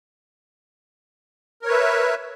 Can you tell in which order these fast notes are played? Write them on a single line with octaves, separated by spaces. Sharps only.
A#4 C#5 B4 E5